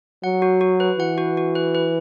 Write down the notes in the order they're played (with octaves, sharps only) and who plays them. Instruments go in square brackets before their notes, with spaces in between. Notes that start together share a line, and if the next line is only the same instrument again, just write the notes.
[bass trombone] F#3 [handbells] F#5
[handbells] F#4
F#4
B4
[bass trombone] E3 [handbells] F#5
[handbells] F#4
F#4
B4
B4